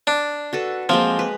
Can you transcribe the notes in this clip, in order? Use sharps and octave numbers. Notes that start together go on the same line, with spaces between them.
D4
F#4 A4 B4
F3 G#3 A#3 C4
B4